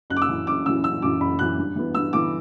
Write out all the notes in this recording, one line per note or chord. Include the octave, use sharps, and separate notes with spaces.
F#1 F#6
D6
E6
F#2 E3
F#1 D6
F#2 E3 E6
F#1 E6
F#2 E3 D6
F#1 B5
F#2 E3 F#6
G2
E3 B3
G2 E6
E3 B3 D6